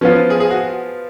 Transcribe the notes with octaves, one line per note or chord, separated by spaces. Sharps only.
F3 B3 C#4 F4
G#4
G#4
F#4